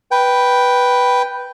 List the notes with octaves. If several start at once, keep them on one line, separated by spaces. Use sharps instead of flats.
B4 G5